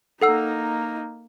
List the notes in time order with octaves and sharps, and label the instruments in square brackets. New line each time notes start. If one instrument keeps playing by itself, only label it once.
[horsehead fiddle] A#3 D#4 [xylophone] A4 F#5 E6